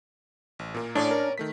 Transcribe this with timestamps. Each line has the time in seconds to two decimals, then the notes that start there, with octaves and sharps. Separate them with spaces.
0.59 A1
0.74 A#2 A#3
0.95 A2 C#4 D4 D5
1.11 A#4
1.38 D#3 A3 B6